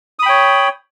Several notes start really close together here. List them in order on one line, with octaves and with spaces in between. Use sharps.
D#6 B5 G5 C#5